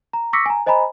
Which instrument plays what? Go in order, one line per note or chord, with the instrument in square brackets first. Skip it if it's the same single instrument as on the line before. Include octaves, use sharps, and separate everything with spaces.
[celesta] A#5
C#6 D6 E6 A#6 B6 C#7
G#5 A#5
C5 D#5 G#5 A#5 B5